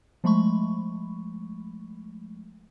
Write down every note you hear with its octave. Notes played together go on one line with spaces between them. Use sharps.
F3 G#3 A3 B5 C#6